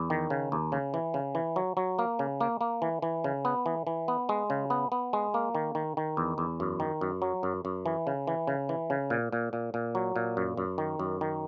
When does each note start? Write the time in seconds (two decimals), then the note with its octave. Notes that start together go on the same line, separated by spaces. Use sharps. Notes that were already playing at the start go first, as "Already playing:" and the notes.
Already playing: E2
0.10 D#3
0.30 C#3
0.52 D#2
0.72 C#3
0.94 E3
1.14 C#3
1.35 E3
1.56 F#3
1.77 F#3
1.99 A#3
2.19 C#3
2.41 A#3
2.61 A#3
2.82 E3
3.02 E3
3.24 C#3
3.45 B3
3.66 E3
3.87 E3
4.08 B3
4.29 G#3
4.50 C#3
4.70 B3
4.92 B3
5.13 G#3
5.34 A#3
5.55 D#3
5.75 D#3
5.97 D#3
6.17 E2
6.38 E2
6.60 F#2
6.80 D#3
7.01 F#2
7.22 F#3
7.43 F#2
7.65 F#2
7.86 E3
8.07 C#3
8.27 E3
8.47 C#3
8.69 E3
8.90 C#3
9.10 A#2
9.32 A#2
9.53 A#2
9.74 A#2
9.95 F#3
10.16 A#2
10.37 F#2
10.57 F#2
10.78 D#3
11.00 F#2
11.21 D#3